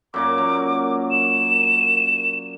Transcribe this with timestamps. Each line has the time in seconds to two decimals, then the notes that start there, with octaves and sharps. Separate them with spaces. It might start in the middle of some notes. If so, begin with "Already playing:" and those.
0.14 F#2 A#2 A#3 D6
0.38 F#3
1.11 E7